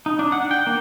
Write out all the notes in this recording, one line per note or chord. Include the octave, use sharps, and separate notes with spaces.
D#4
D4
F#5
G5
A#3